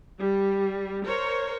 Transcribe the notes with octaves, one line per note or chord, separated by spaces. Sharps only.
G3
A#4 C5 C#5